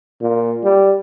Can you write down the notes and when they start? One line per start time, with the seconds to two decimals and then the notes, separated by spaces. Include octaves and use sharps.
0.22 A#2
0.64 G3